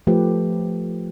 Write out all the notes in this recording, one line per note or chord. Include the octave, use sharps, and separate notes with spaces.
F3 A3 G4 B4